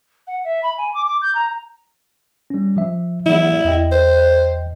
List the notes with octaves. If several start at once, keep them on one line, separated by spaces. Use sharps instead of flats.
F#5
E5
B5
G#5
D6
D6
G6
A#5
G3 C#4
F3 E5
E3 F#3 A#3 E4
E2 D#5 G5
C5